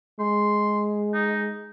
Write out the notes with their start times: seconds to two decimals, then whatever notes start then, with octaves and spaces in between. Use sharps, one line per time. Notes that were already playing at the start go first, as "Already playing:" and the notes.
0.20 G#3 C6
1.14 D#4